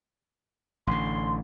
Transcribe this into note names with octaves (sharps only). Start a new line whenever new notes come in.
A1 D3 C6